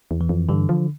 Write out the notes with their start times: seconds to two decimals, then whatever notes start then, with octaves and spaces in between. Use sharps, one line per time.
0.11 E2
0.21 E3
0.29 F2
0.49 G2 D3
0.69 F3